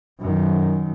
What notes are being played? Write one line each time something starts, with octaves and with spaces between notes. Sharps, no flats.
F#2 D#3